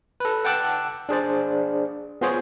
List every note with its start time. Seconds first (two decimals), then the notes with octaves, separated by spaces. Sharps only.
0.20 A4 B4
0.45 F#5 G5 A5 D6 E6 F#6
1.09 D4 G#4 C5 D5
2.21 B3 F4 G#4 C5 C#5